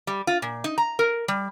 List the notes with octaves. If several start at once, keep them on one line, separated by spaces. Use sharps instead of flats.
G3
F4
A#2
D#4
A#5
A#4
G3